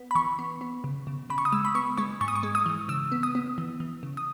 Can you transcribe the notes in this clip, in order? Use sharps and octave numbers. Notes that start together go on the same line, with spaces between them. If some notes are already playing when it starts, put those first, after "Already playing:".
Already playing: B3
B5
E3 C#6
B3
B3
C#3
C#3
C#3 B5
C#6
D#6
G#3 E6
B5
B3 C#6
G#3 C#6
G#2 C#6
D#6
C#6
G#3
D#6
E3
C#3 E6
B3
D#6
B3
E3
E3
C#3
D#6